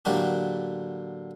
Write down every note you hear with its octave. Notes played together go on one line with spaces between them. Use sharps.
A2 D3 F#3 A#3 F#4 G4